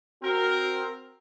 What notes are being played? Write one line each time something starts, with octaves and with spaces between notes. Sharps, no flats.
C4 F#4 A#4